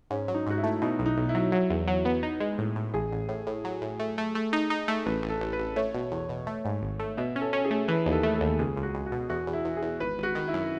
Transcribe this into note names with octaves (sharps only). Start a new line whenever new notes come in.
G#2 C#4
F#3
D#4
G#2 F#4
E4
A3
B2 D#4
B1
D#4
B1
E4
F#3
F#3 E4
E2
F#3
B3
D#4
G#3
A2
A2
A1 G#4
A1
A2
A2
F#3
A2
A3
A3
A3
D#4
D#4
A3
A1 B4
A1
A4
A1
B4
A1
A3 C#5
B2
E2
B2
A3
G#2
G#1
A3
B2 E5
C#4
A4
C#4
G#4
A3
E3 B4
D#2
A4
A3
A4
D#2
C#2 G#4
C#2
F#4
C#2
F#4
B2
E2 F#4
E2
E4
E2
G#4
E2
G#1 B4
G#1
F#4
D#3
E4
F#2